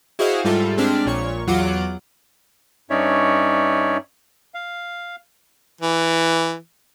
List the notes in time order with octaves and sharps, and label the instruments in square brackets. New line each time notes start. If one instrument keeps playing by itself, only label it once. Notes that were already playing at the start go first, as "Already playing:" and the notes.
[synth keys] E4 F#4 G#4 C5 D#5 F5
G#2 G3 F4 A4 E5
G#3 C4 D4 F6 B6
A#1 A#2 C#5 C#6
E2 F#3 F4 F#5 D6 D7
[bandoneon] G2 C#4 D#4 C#5 D5 E5
F5
[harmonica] E3